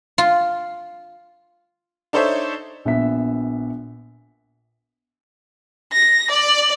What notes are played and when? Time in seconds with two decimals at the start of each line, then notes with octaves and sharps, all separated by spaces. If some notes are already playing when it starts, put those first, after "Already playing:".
0.18 F4
2.13 D4 D#4 A4 C5 C#5 E5
2.85 A#1 B3 E5 B6
5.94 A#6
6.31 D5